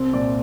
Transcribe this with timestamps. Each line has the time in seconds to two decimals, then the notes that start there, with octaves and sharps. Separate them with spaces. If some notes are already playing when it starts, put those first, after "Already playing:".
Already playing: C2 C4
0.13 A#2 D5